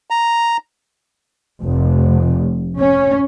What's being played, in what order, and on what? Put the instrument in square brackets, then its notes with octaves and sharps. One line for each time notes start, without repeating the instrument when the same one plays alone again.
[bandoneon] A#5
[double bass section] F1
C#4